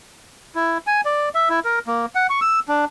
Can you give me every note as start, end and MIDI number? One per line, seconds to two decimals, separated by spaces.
0.55 0.78 64
0.87 1.01 80
1.05 1.29 74
1.35 1.49 76
1.49 1.60 64
1.65 1.79 70
1.87 2.06 58
2.15 2.27 78
2.30 2.40 85
2.41 2.60 88
2.68 2.85 62